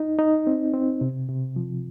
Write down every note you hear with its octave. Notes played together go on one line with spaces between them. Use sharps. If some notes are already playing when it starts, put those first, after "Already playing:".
Already playing: D#4
D#4
C4
C4
C3
C3
F3